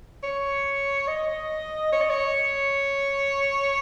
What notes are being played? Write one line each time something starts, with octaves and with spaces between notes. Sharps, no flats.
C#5
D#5
C#5
D#5
C#5